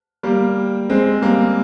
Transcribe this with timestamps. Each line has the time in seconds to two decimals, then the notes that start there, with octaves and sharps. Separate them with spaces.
0.23 G3 A#3
0.90 G#3 C4
1.22 G3 A#3